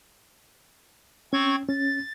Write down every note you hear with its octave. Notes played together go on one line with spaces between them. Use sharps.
C4 C#4 C#6 G#6
C#4 A6